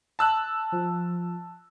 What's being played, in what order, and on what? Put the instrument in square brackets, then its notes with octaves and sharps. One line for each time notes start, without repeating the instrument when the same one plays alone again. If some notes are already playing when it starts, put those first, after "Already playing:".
[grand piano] A5 E6 F#6
[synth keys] F3